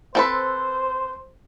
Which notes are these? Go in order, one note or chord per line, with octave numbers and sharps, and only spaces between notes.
C4 A4 B4 C5